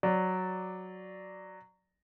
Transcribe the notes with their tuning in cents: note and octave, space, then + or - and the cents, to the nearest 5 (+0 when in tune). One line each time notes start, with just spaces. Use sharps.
F#3 +0 D5 +0